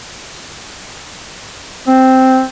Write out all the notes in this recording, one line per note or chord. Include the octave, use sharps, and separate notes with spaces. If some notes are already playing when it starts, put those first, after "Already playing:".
C4